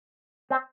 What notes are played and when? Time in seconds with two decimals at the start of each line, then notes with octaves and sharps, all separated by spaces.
0.50 C4